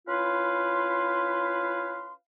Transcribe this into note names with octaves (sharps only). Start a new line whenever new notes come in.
C#4 E4 F4 B4 F5 C6